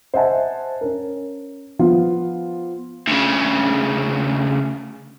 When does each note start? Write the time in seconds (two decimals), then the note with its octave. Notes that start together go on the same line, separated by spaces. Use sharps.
0.14 C5 D#5 E5 F#5 G#5 A5
0.81 C#4 A#4
1.79 F3 B3 F4
3.08 D2 C#3